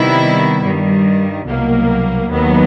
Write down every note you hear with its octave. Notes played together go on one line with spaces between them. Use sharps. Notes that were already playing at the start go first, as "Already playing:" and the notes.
Already playing: C3 D#3 G3 B3 E4
G2 D#3 G3
C2 B2 F#3 A#3
D#2 D#3 F#3 B3